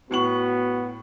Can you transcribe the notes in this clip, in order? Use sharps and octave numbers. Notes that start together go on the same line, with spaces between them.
A2 B3 F#4 C#6 F#7